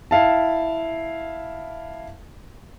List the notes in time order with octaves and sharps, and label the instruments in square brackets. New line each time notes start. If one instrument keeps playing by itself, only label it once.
[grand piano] E4 F5 A5